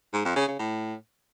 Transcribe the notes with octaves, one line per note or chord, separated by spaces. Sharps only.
G#2
F2
C#3
C#3
A2